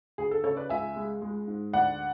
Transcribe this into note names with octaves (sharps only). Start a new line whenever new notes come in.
D2 G#4
A4
C#3 A4 C#5
B4 D5
C#2 E5 G#5
G#3
G#3
G#2
D2 D5 F#5